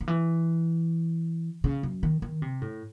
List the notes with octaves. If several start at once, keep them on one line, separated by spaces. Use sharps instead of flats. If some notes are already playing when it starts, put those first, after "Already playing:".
D#3
E3
C#3
F#2
D#3
D#3
C3
A2